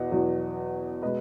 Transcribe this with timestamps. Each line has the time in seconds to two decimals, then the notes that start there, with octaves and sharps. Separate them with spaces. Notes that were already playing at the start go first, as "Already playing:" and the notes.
Already playing: E2 B2 D#5 F#5
0.11 E2 B2 F#3
1.02 B2 G#3 B4 D#5